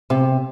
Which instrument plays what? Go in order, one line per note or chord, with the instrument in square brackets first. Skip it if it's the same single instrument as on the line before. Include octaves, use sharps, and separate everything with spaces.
[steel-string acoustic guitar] C3